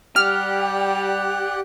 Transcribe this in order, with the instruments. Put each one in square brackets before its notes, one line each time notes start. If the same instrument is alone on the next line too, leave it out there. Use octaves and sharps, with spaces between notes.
[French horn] G3 [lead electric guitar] G4 [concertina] D5 F#5 F#6 [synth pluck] F6